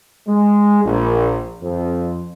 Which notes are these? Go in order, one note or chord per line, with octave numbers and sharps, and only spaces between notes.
G#3
A#1
F2